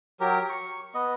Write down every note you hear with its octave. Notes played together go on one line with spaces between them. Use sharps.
F#3 G4 A#4
C#6
B3 D#5